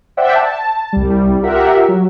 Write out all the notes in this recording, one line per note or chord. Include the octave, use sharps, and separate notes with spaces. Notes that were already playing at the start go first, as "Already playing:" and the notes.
C5 D5 E5 F#5 G5
A5
C2 G3
F4 G4 A#4 E5 F#5
F#3